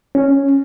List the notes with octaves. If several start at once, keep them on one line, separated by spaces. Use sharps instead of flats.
C#4